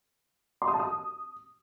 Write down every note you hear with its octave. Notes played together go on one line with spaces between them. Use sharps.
C6
D#6
A5
D#6